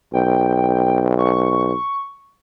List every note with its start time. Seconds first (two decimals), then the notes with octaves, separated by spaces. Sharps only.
0.13 B1 G5
1.18 C#6